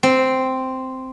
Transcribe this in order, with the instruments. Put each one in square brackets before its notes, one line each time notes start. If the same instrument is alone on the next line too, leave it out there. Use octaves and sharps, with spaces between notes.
[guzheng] C4